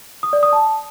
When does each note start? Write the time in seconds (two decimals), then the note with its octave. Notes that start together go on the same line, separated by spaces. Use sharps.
0.23 D#6
0.33 D5
0.43 D#6
0.53 A5